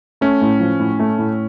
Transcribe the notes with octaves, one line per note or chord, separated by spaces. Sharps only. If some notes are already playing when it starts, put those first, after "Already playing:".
A3 C#4
A2
F3
A2
A3
A2